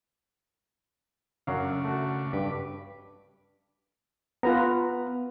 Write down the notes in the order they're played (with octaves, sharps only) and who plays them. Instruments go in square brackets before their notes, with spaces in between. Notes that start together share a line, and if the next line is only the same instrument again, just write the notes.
[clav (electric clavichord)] F#2 F#3 F5 [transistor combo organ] C#3 D4
[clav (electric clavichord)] A3 F#4
[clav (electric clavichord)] G2 [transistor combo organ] B4 D6
[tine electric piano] B3 [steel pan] F4 B4 A#5